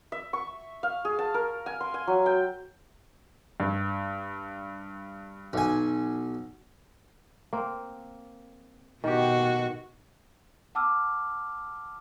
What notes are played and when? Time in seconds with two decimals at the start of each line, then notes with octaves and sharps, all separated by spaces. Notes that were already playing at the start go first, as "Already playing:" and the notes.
0.12 E5
0.33 C#6
0.83 F5
1.05 G#4
1.19 A5
1.34 A#4
1.66 G#5
1.81 C6
1.94 G#5
2.07 F#3
2.26 G5
3.60 G2
5.53 B1 G#5
7.53 A#3 C4
9.04 B2 D#3 F#4 G4
10.75 F#5 A5 D6 E6 F6